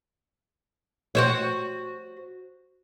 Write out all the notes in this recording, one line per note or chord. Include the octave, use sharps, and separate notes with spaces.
F#4 C5 C#5